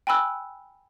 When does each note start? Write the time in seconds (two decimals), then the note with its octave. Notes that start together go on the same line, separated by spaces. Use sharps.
0.07 G5 G#5 B5 E6 F#6